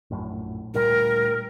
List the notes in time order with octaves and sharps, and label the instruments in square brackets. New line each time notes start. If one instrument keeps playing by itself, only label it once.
[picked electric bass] A#1 F#2 A2
[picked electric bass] D2 A#2 G3 [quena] A#4